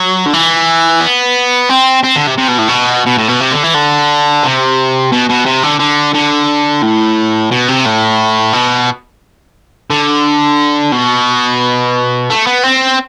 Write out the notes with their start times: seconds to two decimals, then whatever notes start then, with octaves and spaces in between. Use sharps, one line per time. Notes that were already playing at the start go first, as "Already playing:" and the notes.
Already playing: F#3
0.26 D3
0.33 E3
1.01 B3
1.70 C4
2.04 C4
2.16 D3
2.27 C3
2.38 C3
2.48 B2
2.59 A2
2.69 B2
3.07 B2
3.19 A2
3.29 B2
3.41 C3
3.52 D3
3.64 E3
3.74 D3
4.43 C3
5.12 B2
5.29 B2
5.46 C3
5.63 D3
5.79 D3
6.14 D3
6.82 A2
7.51 B2
7.68 C3
7.86 A2
8.53 B2
9.90 D3
10.92 B2
12.30 A3
12.47 B3
12.63 C4